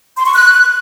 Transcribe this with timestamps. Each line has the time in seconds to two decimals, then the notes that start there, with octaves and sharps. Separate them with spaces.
0.17 C6
0.25 C#6
0.33 F#6